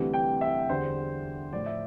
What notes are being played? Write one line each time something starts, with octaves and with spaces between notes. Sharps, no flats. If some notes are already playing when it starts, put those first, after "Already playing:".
Already playing: D2 C3 E3 G3
G5
E5
E2 D3 G3 C5
A2 F3 D5
E5